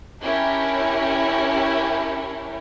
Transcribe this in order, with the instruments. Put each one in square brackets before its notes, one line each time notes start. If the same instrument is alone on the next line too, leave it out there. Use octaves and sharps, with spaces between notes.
[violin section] C#4 D4 E4 G4 A#4 C#5